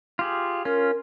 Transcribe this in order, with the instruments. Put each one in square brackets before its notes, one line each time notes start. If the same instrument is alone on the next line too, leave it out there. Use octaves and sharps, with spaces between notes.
[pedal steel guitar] F4 G4 G#4
[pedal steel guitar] C#4 F4 [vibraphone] A#4